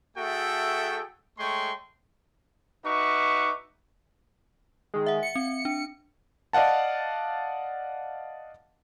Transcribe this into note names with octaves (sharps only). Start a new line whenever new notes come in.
A3 F#4 G#4 A4 E5 G5
G#3 A3 C#5 G5 C6 C#6
D#4 F#4 B4 E5 C#6 D6
D#3 G#3
E5 F#5
C#7
C4
D4
D5 D#5 F5 F#5 A5